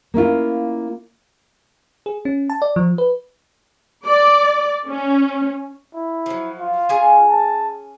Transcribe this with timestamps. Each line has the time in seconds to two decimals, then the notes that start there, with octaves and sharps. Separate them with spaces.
0.14 A#3 C#4 E4 F4
2.06 G#4
2.25 C#4
2.50 A5
2.62 D5
2.76 F3
2.98 B4
4.06 D5
4.88 C#4
5.94 E4
6.26 F3 F#3
6.60 F4
6.89 C#4 G#4 G#5
7.29 A5